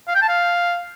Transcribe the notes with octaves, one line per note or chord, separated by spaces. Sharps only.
F5
G5
A5
F5